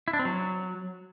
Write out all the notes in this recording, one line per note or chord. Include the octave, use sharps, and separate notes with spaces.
E4
D4
C4
F#3